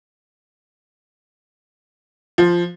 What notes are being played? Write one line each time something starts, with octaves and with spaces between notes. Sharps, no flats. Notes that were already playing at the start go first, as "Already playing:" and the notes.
F3